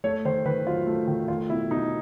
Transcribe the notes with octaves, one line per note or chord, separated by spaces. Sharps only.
A3 C#5
D#3 C5
D#3 B4
F#3 F4
A3
D#3
A3 F4
B2 E4
B2 D#4